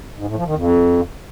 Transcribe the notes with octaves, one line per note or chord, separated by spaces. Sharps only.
G#2
A2
F3
D#3
F2